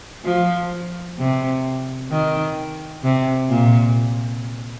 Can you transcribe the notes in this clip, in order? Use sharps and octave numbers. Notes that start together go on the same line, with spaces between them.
F3
C3
D#3
C3
A#2